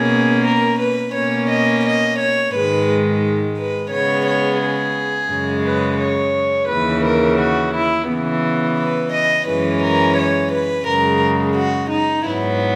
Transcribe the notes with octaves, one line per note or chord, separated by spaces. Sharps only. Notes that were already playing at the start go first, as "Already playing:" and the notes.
Already playing: B2 A#3 C#4 G#4
A#4
B4
B2 A#3 C#4 C#5
D#5
D#5
C#5
G#2 D#3 G#3 B4
B4
C#3 G#3 B3 C#5
C#5
G#4
F#2 C#3 G#3
B4
C#5
D#2 C#3 E3 B4
A#4
F#4
E4
C#3 E3 B3
B4
D#5
F#2 E3 G#3 C#4 B4
A#4
C#5
B4
F#2 C#3 G#3 A#4
F#4
D#4
G#2 F#3 B3 E4